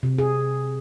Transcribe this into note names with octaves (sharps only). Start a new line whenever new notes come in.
C3
G#4